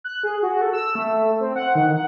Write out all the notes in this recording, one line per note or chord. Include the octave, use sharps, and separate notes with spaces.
F#6
G#4
F#4
A4
E6
A3
C4
F#5
D#3
F#5